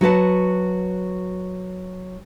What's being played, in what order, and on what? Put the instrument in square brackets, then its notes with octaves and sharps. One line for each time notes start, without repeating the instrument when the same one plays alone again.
[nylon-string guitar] F#3 F#4 B4 A5